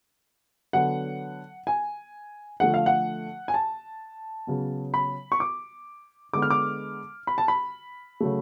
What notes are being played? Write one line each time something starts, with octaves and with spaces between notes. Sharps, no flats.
D3 F#3 B3 F#5
G#5
D3 F3 A3 F#5
F5
F#5
G#5
A5
C#3 F#3 B3
B5
C#6
D6
D3 G#3 B3 D6
F6
D6
B5
A5
B5
C#3 F#3 A3